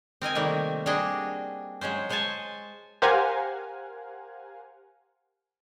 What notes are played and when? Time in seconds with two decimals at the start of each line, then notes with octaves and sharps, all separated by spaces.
0.21 C4 A#4 D#5 G#5
0.35 C3 D#3 G3 A3 A#3
0.86 G3 D4 F#4 G#4 D#5
1.81 F#3 G#3 C#4 C5
2.09 G#3 C5 C#5 G#5 A5
3.02 G4 A#4 C5 F5 F#5 G#5